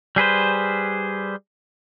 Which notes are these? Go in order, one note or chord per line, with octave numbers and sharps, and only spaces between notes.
G3 G#4 B4 C5